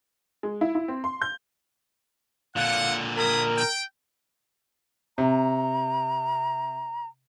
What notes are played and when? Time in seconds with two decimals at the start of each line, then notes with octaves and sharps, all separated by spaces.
0.43 G#3
0.61 E4
0.75 E4
0.88 C4
1.04 C6
1.22 G6
2.56 A#2 D3 F5 F#5
3.17 G#4 A#4 B5 D#6
3.57 G5
5.18 C3 A#5